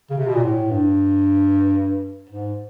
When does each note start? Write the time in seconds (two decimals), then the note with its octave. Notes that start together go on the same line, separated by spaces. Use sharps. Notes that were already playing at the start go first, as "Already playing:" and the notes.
0.10 C#3
0.18 C3
0.27 B2
0.35 A#2
0.44 A2
0.71 G2
2.30 G#2